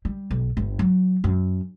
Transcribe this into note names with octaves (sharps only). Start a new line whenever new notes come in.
G3
B1
G1
F#3
F#2